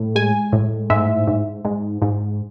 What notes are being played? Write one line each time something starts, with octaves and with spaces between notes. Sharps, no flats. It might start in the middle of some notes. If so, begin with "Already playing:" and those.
Already playing: A2
G#3 G#5
A2
G#2 E5
G#2
G#2
G#2